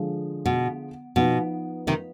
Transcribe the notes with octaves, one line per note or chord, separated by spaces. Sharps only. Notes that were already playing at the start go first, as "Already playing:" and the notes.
Already playing: D3 F3 G#3
B2
B2 F3 B3 D#4
C3 D#3